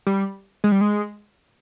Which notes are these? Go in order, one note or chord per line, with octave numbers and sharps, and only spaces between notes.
G3
G#3
G3
G#3